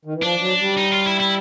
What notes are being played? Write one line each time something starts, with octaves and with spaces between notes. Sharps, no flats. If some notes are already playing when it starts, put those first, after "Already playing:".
D#3
E3
F3 D4
F#3
G3
D#4
F4
E4
E4